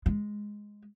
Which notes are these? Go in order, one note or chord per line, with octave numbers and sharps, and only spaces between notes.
G#3